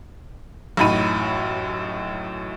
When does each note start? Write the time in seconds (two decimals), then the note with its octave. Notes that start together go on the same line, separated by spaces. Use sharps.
0.77 A1 F#2 A2 D#4 B5 D#7